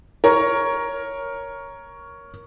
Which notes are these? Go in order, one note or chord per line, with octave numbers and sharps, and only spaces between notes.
A#4 C#5